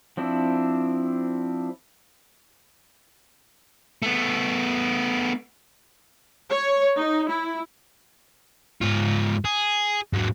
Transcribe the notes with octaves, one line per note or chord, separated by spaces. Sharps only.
F3 C4 D4 E4
A3 B3
C#5
D#4
E4
G#2 F4
G#4
G#2 F#3